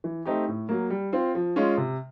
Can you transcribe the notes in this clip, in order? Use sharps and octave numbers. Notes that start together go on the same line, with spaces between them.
E3
A3 C4 D#4 G4
A2
F#3 A#3
G3
C4 F4
F3
G#3 C#4 F4
C3